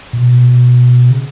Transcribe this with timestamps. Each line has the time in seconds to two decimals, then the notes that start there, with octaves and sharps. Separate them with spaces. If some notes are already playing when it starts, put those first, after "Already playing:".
0.13 A#2
0.19 B2
1.11 C#3